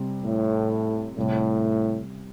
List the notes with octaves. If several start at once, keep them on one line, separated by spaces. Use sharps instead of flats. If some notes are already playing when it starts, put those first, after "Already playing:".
Already playing: C3 G3 C4
A2
A2 C3 G3 E4